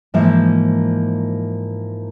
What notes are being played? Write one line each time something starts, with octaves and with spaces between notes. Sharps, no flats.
G#2 E3 F3 A#3 C5 E5